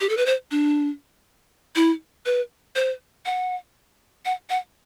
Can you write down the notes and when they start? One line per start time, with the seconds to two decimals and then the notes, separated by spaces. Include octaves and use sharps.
0.01 G4
0.09 A4
0.17 B4
0.26 C5
0.51 D4
1.76 E4
2.26 B4
2.76 C5
3.26 F#5
4.25 F#5
4.50 F#5